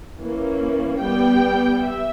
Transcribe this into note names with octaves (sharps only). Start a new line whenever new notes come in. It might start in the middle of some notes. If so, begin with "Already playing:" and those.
E3 A#3 C#4
G3 B3 G5
E5